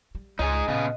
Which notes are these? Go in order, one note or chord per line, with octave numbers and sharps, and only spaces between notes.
G3
C#2 D#4 G#4 D#5
A#2 C#3 B3